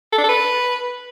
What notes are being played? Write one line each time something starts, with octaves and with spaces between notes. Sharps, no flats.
A4
D4
A4
B4